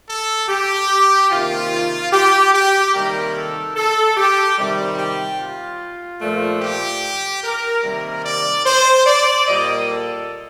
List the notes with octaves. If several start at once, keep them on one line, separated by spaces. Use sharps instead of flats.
A4
G4
C3 D#3 A#3 F4
G4
G4
C3 D#3 G3 A#3 A#4
A4
A4
G4
C3 D#3 G3
G4
F4
A#2 F3 A3
G4
A#4
C3 D#3 G3 A#3 A#4
D5
C5
D5
A#2 G3 A#3 D#5
A4